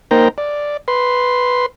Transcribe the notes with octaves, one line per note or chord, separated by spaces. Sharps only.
A#3 D#4 A#4 C5 G5 A#5
D5
B4 C6